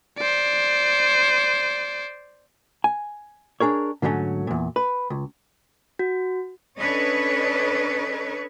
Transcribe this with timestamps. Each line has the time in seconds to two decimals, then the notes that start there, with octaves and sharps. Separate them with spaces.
0.17 C5 D5
2.84 G#5
3.60 D4 G#4 A#4 C#5
4.02 G#2 D3 F#3 A3 C#4
4.47 E2 A#2
4.76 B4
5.10 C#2
5.99 F#4
6.78 C#4 D4 A4 B4 C#5 D#5